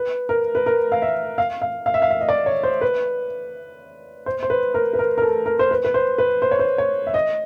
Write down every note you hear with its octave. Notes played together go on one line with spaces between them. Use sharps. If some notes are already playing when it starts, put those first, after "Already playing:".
Already playing: B4
A#4
B4
A#4
F5
E5
F5
F5
F5
E5
F5
E5
D#5
D5
C#5
C5
B4
C5
C5
B4
A#4
B4
A#4
A#4
A4
A#4
C5
B4
B4
C5
B4
C5
C#5
C5
C#5
E5
D#5